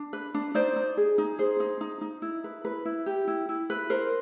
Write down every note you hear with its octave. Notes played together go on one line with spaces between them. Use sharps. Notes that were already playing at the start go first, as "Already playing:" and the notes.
Already playing: D4
B4
D4
D#4 C5 D5
D#4
G#4
D#4
G#4 C5
D#4
D#4
D#4
E4
B4
B4
E4
G4
E4
E4
B4
A#4 C5